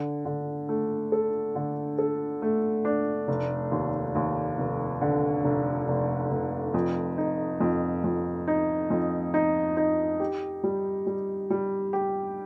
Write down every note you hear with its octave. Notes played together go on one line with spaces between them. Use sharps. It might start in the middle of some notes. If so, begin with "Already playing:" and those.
Already playing: D3
D3
A3
A4
D3
A4
A3
D4
F1
D#2
D#2
F1
D3
F1
F1
F1
F2
D#4
F2
F2
D#4
F2
D#4
D#4
G4
G3
G3
G3
G4